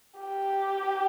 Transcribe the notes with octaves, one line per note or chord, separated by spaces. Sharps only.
G4